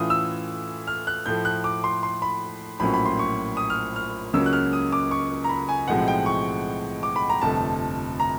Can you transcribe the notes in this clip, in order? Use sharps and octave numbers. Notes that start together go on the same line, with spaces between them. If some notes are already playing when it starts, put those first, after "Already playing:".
Already playing: A2 E3 A3 C#4 F4 D#6
E6
F6
F#6
A2 F3 A3 G6
F#6
D6
C6
C6
B5
A#1 A2 F#3 A#3 C#4 B5
B5
C6
C#6
D#6
F6
F6
C#2 C#3 F#3 A#3 C#4 E6
F#6
F6
D#6
D6
C#6
A#5
B5
G#5
B1 A2 F3 G#3 C4 F#5
G5
C#6
D6
B5
A#5
G1 F2 C3 F3 A3 A5
A#5